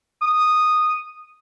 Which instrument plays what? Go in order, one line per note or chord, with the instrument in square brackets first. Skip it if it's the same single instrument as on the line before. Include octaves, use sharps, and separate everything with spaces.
[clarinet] D#6